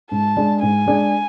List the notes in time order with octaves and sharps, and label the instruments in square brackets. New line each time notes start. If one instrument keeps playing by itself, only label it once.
[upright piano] G#2 [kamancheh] A5
[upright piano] G#3 D4 G#4
[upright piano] G#2 [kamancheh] G#5
[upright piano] G#3 D4 G#4